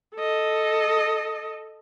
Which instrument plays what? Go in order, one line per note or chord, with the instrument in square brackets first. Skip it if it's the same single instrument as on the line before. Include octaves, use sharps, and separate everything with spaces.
[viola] A4 D#5